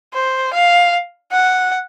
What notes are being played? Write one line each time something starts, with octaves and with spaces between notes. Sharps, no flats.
C5
F5
F#5